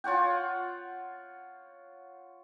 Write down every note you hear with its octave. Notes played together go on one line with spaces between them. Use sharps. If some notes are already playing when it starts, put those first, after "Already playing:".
F4 C#5 F#5 G5